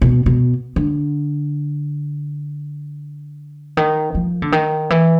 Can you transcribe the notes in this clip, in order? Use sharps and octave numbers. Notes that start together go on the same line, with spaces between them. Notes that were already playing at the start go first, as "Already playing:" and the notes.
B2
B2
D3
D#3
F3
D3
D#3
E3